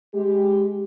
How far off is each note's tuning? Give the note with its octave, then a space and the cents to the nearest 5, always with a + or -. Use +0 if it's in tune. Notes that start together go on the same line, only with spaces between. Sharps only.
G#3 +0 G4 +0